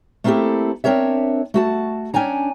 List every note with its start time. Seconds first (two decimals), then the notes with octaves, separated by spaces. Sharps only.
0.24 A3 A#3 C4 E4 G4 A4
0.84 C4 D4 A#4 C#5 E5
1.54 A3 F#4 A5
2.14 C#4 D4 G5 G#5 A#5